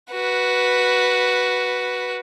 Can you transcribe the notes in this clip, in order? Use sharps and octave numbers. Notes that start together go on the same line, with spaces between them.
F#4 B4